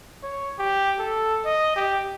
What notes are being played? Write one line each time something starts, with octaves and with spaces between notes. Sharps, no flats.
C#5
G4
A4
D#5
G4